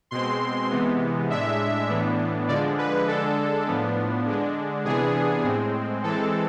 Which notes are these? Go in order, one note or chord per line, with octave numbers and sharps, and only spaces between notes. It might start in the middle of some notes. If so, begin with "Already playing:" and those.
B2 G#3 C4 C6
C3 E3 G#3 B3
A2 G#3 D4 E5
A2 E3 B3 D4
D3 F3 G#3 D4 D5
B4
D3 G#3 D4 A4
A2 F3 B3 D4
D3 G#3 D4
C3 E3 B3 D4 G#4
A2 G#3 C4
E3 G#3 C4 A4